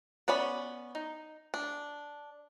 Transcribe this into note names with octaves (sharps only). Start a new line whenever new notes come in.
B3 C#4 D5 B5
D#4
D4